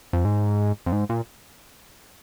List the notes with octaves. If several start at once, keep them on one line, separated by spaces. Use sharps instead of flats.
F2
G#2
F2
G#2
A#2